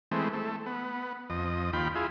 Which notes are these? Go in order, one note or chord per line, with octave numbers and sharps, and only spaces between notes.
E3 G#3 A3 C4
A3
B3
F2 D#5
D#2 F4 G5 B5
E4 F4 G#4